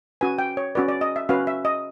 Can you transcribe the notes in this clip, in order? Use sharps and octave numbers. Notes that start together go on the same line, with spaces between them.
C#4 F#4 B4 G#5
G5
C#5
C#4 F#4 B4 D5
D5
D#5
E5
C#4 F#4 B4 F5
E5
D#5